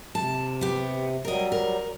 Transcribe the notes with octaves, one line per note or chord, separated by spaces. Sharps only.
C3 A5
B3 G4
F#3 G3 A#4 D#5
A#4